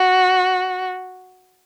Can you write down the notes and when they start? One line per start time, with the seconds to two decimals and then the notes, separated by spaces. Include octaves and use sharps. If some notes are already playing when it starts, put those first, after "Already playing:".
Already playing: F#4